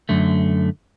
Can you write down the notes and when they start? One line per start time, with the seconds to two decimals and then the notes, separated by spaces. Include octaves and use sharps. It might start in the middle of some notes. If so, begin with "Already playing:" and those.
0.09 F#2 D3 A3